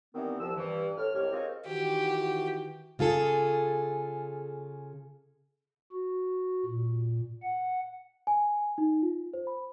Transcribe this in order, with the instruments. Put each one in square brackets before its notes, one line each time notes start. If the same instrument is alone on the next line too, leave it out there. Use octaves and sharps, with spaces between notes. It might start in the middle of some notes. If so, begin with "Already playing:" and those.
[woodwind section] D#3 E3 G3 B3 C4 A#4
C2 F3 E6
G2 E3
A2 F6
C2 G#2 C3 G4 C#5 F6
C4 D#4 F4 G#4 A#4 C#5
[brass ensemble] D#3 E3 F#4 [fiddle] G4
[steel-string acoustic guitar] C#3 F4 G#4 A4
[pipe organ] F#4
A#2
F#5
[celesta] G#5
D#4
F4
C5
B5